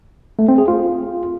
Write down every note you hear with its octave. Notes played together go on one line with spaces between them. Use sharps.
A3
C4
G#4
F4